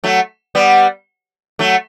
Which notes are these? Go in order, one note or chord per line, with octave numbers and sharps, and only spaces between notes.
F#3 A3
G3 B3
F#3 A3